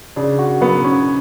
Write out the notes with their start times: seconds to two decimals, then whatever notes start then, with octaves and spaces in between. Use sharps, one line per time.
0.16 C#3 D4
0.39 F#4
0.61 F#3 B3
0.84 C#4